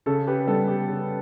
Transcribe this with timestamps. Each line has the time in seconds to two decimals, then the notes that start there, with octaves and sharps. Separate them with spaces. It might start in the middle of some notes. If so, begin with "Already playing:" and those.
0.06 C#3 A4
0.27 G4 B4
0.40 B4
0.47 G3 B3 A4
0.68 G4
0.89 C#3